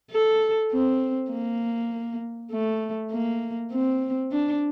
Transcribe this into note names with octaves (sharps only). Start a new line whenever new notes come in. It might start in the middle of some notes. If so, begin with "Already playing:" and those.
A4
C4
A#3
A3
A#3
C4
D4